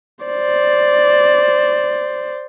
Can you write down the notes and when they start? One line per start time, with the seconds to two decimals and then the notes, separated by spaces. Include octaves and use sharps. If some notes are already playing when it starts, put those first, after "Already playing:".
0.25 C5 D5